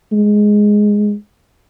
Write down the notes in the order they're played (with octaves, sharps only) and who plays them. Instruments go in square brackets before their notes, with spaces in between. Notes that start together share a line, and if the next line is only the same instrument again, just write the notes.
[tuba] G#3